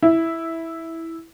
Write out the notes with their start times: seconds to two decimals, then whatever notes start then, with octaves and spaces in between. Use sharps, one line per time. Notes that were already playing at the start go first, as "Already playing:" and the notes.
0.03 E4